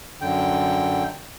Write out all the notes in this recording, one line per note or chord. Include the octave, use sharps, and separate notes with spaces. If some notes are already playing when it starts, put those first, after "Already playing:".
F#2 D3 G5